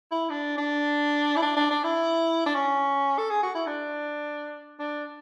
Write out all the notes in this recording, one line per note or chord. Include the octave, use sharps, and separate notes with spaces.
E4
D4
D4
E4
D4
D4
D4
E4
D4
C#4
A4
G#4
F#4
E4
D4
D4